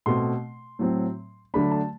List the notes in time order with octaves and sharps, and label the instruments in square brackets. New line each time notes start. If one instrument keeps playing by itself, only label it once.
[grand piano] B2 A3 C4 C6
A2 F#3 C4
D3 F#3 A3 D4 B5
A5